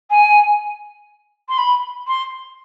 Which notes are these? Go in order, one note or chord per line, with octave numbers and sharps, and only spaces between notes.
G#5
C6
B5
C6